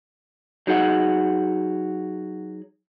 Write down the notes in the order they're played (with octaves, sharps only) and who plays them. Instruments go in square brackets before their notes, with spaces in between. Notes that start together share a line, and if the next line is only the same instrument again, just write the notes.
[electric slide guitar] F#3 D#4 G#4 F#5